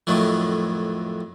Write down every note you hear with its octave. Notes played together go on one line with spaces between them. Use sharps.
F2 A2 D#3 F#3